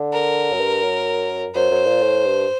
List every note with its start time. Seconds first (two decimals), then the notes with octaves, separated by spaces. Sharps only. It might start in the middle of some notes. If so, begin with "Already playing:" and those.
Already playing: D3
0.13 A#4
0.53 F#2
0.60 G2
0.83 F#2
1.54 F#2 C5
1.71 F#2
1.86 A#2
2.02 A2
2.25 G2